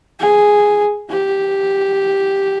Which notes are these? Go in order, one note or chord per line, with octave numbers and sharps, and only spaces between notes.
G#4
G4